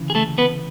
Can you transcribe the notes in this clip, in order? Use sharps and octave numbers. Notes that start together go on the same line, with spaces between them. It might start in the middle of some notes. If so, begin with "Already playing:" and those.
Already playing: D2 C#3 E3
G#4
A3 A4
B3 B4